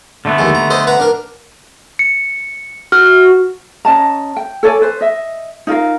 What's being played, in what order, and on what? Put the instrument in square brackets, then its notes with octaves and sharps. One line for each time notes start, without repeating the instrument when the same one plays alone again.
[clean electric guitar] D3 A3 B3
[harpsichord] D#2 G#3
A#5
A4 C5 D#5
B4 F#5 A#5
D4 A#4
[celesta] C#7
[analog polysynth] F#4 [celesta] F6
[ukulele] C#4 D#5 A5 A#5
G5
A4 C#5 D5 G#5
B4 C5
D#5 E5
D#4 F4 A#4 F5